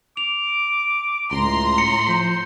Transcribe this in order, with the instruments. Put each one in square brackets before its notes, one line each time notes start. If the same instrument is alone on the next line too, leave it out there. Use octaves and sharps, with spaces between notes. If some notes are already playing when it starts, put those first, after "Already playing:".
[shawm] D6 [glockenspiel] F7
[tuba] C#2 [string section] A2 A#5 C6
[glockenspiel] C#7
[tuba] F3 [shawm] C5